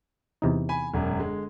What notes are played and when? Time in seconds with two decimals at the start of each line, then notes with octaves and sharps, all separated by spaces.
0.42 E2 C3 D#4
0.69 G#5 B5
0.93 E1 F#2
1.18 D3 G#3